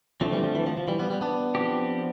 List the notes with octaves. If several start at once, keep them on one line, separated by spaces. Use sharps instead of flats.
D3 F3 A3 C4
E3 G3
F3
E3
F3
F3
E3 G3
G3 B3
G3 B3
B3 D4
F3 C4 G4